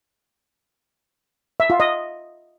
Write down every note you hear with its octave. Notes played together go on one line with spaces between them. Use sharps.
E5
F4
D#5